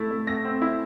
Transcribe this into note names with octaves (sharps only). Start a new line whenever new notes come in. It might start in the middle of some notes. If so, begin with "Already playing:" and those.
Already playing: A3 E4 A6
A3
A3 A#6
C4
E4